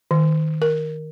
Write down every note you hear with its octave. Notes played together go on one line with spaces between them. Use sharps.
D#3
A#4